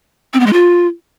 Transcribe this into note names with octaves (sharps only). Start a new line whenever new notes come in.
C4
B3
G#3
F4